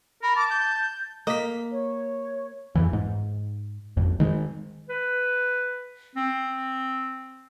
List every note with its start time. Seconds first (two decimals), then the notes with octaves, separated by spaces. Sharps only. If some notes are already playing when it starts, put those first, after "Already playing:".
0.23 A#4 B5
0.36 A5 D6
0.50 G6
1.27 A#3 D#5 B6
1.72 C#5
2.75 F2 E3
2.93 G#2
3.97 G#1 F2
4.20 D#3 G#3
4.89 B4
6.15 C4